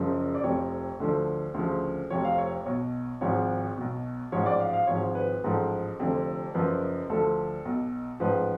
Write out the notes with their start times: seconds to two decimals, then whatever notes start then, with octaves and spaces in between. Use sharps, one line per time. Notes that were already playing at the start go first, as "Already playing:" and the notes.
Already playing: F#1 F#2 C#3 F3
0.35 D5
0.43 F1 F2 F3 C#5
1.00 D2 D3 F3
1.54 D2 C#3 F3
2.10 F1 F2 F3 C#5
2.25 F5
2.38 C#5
2.66 B1 B2 C#5
3.21 G#1 G#2 F3 C#5
3.77 B1 B2
4.32 A1 G#2 F3 C#5
4.46 D5
4.60 F5
4.73 F5
4.87 G#1 G#2 F3 C#5
5.15 B4
5.44 A1 G#2 F3 A4
5.99 F1 F2 D3 F3
6.54 F#1 F#2 F3 B4
7.09 D2 D3 F3 A4
7.65 B1 B2
8.20 A1 G#2 F3 B4